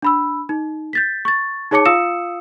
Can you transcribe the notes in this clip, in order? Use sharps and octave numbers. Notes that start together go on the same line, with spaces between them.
D4 B5 E6
D#4
G6 A6 B6
C#6 A6
D#4 G#4 C#5 A5 D6 C#7
F4 F5 D#6 E6 C#7 E7